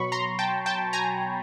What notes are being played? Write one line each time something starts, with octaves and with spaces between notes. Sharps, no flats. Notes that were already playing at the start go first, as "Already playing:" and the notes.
Already playing: B2 F#3 B5 C#6
A#5 C6
G5 A5
G5 A5
G#5 A#5